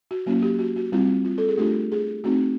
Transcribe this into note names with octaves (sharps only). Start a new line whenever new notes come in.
F#4
F#3 A#3 C#4 E4 F#4
G4
F#4
F#4
G3 C4 E4 F4
F4
A4
G#4
A3 D4 F4 G4
G#4
A3 C4 D#4 F#4